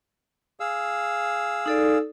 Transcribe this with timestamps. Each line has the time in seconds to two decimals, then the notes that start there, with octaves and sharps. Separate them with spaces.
0.60 G#4 F5 E6
1.66 D#4 A4 D5